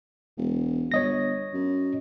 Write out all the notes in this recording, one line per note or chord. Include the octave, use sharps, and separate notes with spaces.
E1
G1 C#5 D#5 A#6
F#2